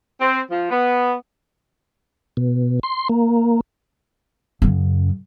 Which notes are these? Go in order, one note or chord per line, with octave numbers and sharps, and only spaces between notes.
C4
F3
B3
B2
C6
A#3
F#2 C#3